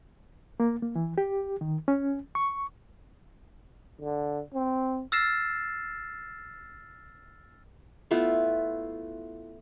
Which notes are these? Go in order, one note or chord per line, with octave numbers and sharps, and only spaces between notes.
A#3
A#3
E3
G4
D#3
C#4
C#6
D3
C4
E6 F6 A6 A#6 C7 E7
A3 B3 E4 F4